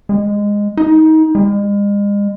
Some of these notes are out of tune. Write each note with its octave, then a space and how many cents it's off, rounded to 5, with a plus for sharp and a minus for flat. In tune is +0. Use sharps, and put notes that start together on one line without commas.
G#3 -15
D#4 +25
G#3 -40